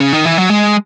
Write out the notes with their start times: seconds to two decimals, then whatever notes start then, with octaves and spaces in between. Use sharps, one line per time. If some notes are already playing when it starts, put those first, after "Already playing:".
0.00 C#3
0.13 D#3
0.25 E3
0.38 F#3
0.50 G#3